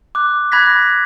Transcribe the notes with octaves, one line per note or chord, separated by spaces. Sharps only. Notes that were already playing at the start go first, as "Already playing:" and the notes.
D6 F#6
B5 F#6 G#6 A#6 B6